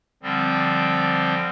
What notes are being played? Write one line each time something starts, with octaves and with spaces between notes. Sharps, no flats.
D3 F3 G3 C4